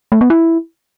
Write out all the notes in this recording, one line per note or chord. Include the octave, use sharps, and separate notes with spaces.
A3
B3
E4